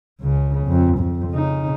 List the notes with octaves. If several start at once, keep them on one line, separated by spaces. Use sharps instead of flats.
C#2 C#3
F2
F2
C#3 D#4